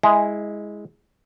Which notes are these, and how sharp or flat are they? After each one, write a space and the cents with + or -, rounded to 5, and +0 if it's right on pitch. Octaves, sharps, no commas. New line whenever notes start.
G#3 +0 E4 -15